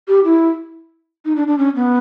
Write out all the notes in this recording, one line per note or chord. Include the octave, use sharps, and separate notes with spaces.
G4
E4
D#4
D4
D4
C#4
B3